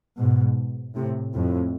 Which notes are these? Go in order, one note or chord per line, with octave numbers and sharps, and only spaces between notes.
G#2 B2
A2 C3
F2 A2